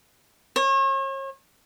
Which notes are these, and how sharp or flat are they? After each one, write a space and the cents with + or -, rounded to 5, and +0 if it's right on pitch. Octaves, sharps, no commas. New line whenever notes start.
C#5 -40